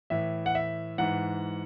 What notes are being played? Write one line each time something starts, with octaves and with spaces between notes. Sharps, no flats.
A2 E3 E5
F#5
E5
G#2 E3 F#5